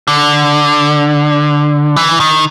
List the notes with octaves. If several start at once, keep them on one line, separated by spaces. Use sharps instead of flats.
D3
E3
D#3